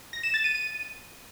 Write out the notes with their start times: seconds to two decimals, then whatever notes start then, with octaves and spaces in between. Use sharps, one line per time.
0.13 A#6
0.23 E7
0.34 A6
0.44 D#7
0.55 D#7